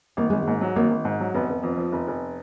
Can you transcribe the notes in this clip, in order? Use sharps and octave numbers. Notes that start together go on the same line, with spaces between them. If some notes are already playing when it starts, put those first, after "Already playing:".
G#1 A#3
G#1 G#3
G#2 A#3
F#3
G#1 A#3
G#1
G#2
F#3
F1 B3
F1
F2
F3
F1
F1